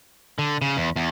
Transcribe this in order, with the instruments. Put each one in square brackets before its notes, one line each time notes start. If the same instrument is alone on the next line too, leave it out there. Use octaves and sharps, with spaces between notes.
[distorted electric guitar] D3
C#3
E2
E2